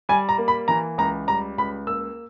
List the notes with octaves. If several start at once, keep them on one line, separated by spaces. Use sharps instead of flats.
G3 G#5
A#5
A#3
B5
E3 A#5
C#2 A#5
G3 A#5
C#2 B5
A#3 E6